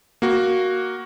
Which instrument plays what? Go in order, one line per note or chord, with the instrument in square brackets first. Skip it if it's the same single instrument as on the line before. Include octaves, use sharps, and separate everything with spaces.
[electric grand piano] A#3 F#4